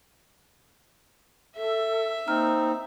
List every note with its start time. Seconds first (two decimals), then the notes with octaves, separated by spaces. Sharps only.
1.57 A4 E5
2.28 A#3 C4 D#4 A#5 F6